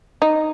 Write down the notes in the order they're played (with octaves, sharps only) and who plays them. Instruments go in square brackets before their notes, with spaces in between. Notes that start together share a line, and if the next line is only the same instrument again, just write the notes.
[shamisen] D#4